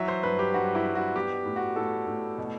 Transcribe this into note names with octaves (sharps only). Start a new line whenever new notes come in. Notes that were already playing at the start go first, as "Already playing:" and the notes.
Already playing: E3 F#3 E5
C5
G2 B4
G4
G2 F#4
E4
G2
F#4
B3 G4
A2
F#4
A2 A4
A2
B2